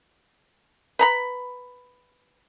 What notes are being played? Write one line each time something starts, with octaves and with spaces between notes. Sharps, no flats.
B4 A#5 B5